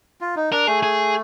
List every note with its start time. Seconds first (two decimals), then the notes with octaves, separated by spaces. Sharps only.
0.21 F4
0.36 D#4
0.52 D4 A#4
0.67 A3 G#4
0.83 G#4